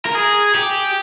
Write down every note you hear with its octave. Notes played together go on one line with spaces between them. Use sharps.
A#4
G#4
G4